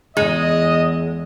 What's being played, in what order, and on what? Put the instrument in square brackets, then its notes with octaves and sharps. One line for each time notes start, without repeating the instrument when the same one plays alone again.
[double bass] E2 [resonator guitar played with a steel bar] G#3 [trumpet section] D#5